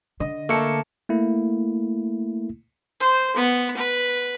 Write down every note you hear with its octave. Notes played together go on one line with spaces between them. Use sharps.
D3 D#5
A3 A#3 A5 C#7
A3 A#3 E4
C5
B3
B4